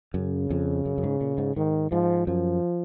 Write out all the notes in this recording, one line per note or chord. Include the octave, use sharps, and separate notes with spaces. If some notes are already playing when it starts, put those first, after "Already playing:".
F#2 C#3
F2
F#2
F#2
G#2
A#2
G#2
G#2 D#3
G#2 F3
F#2 F3